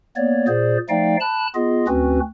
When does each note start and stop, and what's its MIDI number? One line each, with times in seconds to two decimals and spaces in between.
0.16 0.47 58
0.16 0.47 59
0.16 0.47 73
0.16 0.47 74
0.48 0.78 46
0.48 0.78 68
0.48 0.78 72
0.48 0.78 74
0.89 1.17 53
0.89 1.17 57
0.89 1.17 63
0.89 1.17 74
0.89 1.17 77
0.89 1.17 79
1.21 1.47 81
1.21 1.47 83
1.21 1.47 90
1.55 1.86 59
1.55 1.86 65
1.55 1.86 68
1.55 1.86 75
1.88 2.20 38
1.88 2.20 60
1.88 2.20 61
1.88 2.20 66
1.88 2.20 71